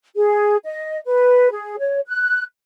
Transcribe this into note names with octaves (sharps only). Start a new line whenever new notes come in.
G#4
D#5
B4
G#4
C#5
F#6